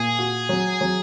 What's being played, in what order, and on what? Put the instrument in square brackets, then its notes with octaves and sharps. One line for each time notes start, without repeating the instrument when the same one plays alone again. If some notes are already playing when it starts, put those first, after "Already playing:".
Already playing: [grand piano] A#2 [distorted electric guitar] G#4
[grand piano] F#4
F#3
F#3